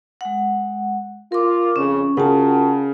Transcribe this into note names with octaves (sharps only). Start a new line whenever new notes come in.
G#3 F#5
F4 A#4 D6
F2 C#3 C#4
C#3 F4 F#4 A#4 F#5 G5 A5